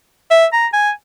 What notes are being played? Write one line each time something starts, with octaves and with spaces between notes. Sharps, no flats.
E5
A#5
G#5